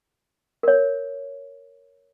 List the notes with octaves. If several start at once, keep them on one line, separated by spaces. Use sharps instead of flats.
A#4 C#5